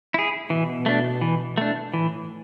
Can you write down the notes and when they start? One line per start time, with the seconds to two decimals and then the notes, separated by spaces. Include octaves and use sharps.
0.14 E4 G#4
0.50 B2 E3
0.86 A3 D4
1.21 E3
1.58 A3 D4
1.93 A2 E3